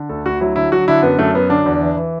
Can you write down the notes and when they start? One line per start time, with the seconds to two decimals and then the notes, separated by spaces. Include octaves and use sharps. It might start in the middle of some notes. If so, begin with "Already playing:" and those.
Already playing: D3
0.09 D2 A4
0.26 D2 F#4
0.40 F#3 E4
0.56 D3 E4
0.72 F#3 F#4
0.88 D3 E4
1.03 F#2 B3
1.19 F#2 A3
1.34 F#3 B3
1.49 D3 D4
1.66 E2
1.81 E3
1.97 E3